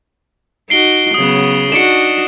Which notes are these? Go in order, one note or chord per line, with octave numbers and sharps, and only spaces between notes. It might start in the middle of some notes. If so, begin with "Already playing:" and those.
D#4 F#4 C7 D7 G7
C#3 F#3 B3 D#6
D4 D#4 F#4 C#7 D7 E7